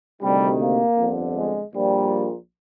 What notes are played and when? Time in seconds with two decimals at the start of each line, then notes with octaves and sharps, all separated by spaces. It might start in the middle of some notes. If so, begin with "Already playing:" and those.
0.21 D2 C3 D#3 G3
0.60 A#3
0.98 G1 F2 D3
1.36 G#3
1.74 A#1 A#2 G3